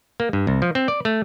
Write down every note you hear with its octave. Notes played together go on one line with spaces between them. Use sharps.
A#3
G2
C2
F3
C4
D5
A3